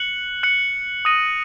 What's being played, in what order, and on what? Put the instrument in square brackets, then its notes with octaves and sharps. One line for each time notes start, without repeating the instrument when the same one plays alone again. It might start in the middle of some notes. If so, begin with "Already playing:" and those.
Already playing: [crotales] F#6 C#7 F#7
F#6 C#7 F#7
D#6 A#6 D#7 F#7